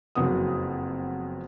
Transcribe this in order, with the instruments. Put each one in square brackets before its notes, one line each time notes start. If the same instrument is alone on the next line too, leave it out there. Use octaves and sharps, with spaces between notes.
[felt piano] F#1 F2 F#3 B3 F#5 D#6